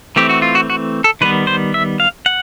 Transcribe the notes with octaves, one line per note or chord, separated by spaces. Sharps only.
E3 A3 C4 G4
F#4
F4
F#4
F#4
A4
D#3 G3 B3 B4
C5
E5
F5
F#5